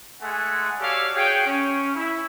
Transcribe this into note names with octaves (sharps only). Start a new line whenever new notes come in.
G#3 A3 F#5 G#5
F#4 G4 A4 C#5 D5 F5
F#4 G#4 C#5 F5 G5
C#4
E4